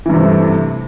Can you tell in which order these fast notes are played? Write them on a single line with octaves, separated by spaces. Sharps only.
E3 G2 C3 A3